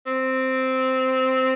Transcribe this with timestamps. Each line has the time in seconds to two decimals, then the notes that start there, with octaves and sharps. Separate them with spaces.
0.06 C4